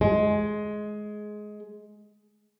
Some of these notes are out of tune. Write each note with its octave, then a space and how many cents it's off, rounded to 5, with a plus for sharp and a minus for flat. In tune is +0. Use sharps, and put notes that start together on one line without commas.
G#3 +15